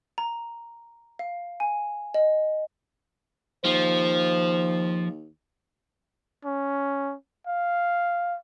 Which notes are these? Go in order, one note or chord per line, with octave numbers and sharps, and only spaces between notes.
A#5
F5
G#5
D#5
D#2 F3 C5
C#4
F5